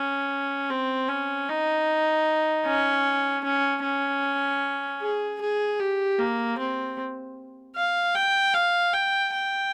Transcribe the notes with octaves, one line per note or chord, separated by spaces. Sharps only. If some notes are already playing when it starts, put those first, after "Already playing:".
Already playing: C#4
C4
C#4
D#4
C#4
C#4
C#4
G#4
G#4
G4
A#3
C4
F5
G5
F5
G5
G5